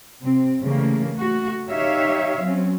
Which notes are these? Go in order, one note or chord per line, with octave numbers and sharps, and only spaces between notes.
C3 C4
C#3 E3 G3 A3 A#3
A3 F#4
D#4 G4 C#5 E5 F5
F#3 C4 C#4